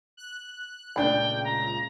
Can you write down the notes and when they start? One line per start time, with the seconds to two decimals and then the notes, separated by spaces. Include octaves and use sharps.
0.17 F#6
0.96 C#2 A#2 C#3 A3 D4 G5 B5
1.44 A#5